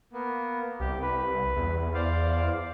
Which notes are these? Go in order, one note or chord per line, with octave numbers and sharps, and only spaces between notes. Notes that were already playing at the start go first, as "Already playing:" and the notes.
A#3 B3
C2 G4
B4
E2
C5 D5 F5